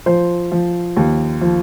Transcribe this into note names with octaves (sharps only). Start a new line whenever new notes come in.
F3 C5
F3
D#2
F3